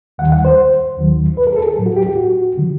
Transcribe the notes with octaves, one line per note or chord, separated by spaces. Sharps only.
D#2 D#3 G3 F#5
F#5
C5
D#2 D#3 F#3
B4
A#4
G#4
A4
G#4
A2 F#3
F#4
G4
G4
F#4
D3 F3